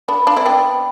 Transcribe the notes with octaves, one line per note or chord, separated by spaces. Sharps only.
B3 D4 B5
D4 F4
C4 E4
B3 D4 G5